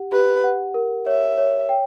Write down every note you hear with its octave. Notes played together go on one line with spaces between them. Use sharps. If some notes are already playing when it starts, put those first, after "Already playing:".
Already playing: G4 F#5
G4 B4
F#5
A#4
C#5 E5
C#5
G5